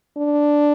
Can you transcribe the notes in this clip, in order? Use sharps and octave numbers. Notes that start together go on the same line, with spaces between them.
D4